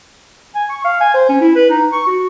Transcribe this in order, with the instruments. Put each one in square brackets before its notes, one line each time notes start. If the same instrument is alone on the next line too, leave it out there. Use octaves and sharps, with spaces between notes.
[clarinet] G#5
C#6
F5
G#5
C5
C#4
E4
B4
D#4
C#6
F#4